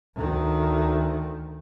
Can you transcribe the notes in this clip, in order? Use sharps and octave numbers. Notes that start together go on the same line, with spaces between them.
D2 D#3